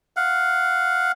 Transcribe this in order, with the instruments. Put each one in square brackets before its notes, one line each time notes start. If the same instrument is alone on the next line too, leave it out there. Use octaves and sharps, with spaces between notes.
[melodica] F5 F#5